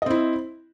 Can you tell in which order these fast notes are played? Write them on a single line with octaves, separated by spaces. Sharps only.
D#5 C4 E4